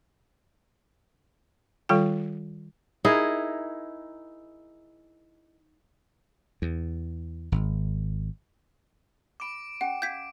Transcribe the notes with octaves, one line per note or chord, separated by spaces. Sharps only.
D#3 G3 F4 A4 G5
D#4 E4 G#4 A#4
E2
G#1
B5 C#6 D6 D7
C#4 G4 F#5 G5
F5 F#5 G6 G#6 B6